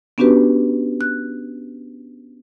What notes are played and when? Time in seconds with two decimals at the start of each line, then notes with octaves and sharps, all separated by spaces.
0.18 B3 C#4 D4 F#4 G4 B4
1.01 F#6